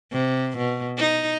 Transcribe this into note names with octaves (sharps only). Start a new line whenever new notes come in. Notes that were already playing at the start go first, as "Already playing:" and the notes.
C3
B2
D#4